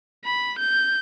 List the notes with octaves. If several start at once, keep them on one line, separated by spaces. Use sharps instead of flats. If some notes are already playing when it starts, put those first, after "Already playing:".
B5
G6